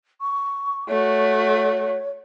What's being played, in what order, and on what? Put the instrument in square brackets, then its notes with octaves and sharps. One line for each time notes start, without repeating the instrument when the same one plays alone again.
[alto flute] C#6
[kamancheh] A3 F#4 [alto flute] C#5